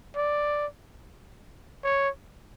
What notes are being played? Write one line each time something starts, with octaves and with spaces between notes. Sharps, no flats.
D5
C#5